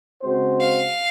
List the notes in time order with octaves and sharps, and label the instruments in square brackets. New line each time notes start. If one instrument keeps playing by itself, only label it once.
[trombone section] C#3 G#3 C4 F#4 C5
[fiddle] F5